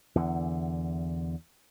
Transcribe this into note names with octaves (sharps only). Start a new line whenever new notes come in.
E2 D3